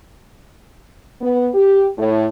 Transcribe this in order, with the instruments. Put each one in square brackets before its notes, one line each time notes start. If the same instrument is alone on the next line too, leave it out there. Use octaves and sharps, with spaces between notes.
[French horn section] B3
G4
A2